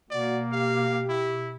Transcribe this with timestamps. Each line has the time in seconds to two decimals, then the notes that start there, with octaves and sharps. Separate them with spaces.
0.11 B2 A#3 F#4 D5
0.52 G4 F5
1.09 E4